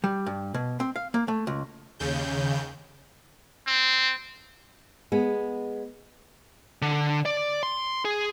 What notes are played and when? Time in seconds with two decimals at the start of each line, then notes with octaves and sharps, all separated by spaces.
0.04 G3
0.26 G2
0.54 B2
0.80 C4
0.96 F5
1.14 A#3
1.28 A3
1.47 C#2
1.99 D#2 C#3 G6
3.67 C4
5.12 G#3 B3
6.82 D3
7.25 D5
7.63 C6
8.05 G#4